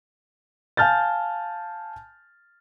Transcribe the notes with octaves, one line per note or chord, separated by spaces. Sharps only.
F5 G#5 A5 F6 G6 A6